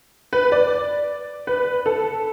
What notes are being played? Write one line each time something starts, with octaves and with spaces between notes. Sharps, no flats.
B4
D5
B4
A4